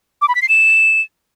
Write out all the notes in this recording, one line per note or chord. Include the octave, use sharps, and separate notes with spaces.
D6
B5
B6
C7
E7